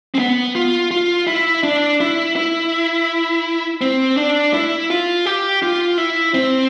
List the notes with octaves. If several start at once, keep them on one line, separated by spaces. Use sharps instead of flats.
C4
B3
F4
F4
E4
D4
E4
E4
C4
D4
E4
F4
G4
F4
E4
C4